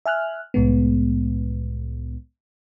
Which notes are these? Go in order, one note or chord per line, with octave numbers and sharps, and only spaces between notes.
E5 G#5 F6 F#6
C2 A2 G#3 B3